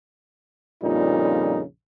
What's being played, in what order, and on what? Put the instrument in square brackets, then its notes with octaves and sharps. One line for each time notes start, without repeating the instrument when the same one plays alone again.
[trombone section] A#1 F2 A#2 C#3 G3 D#4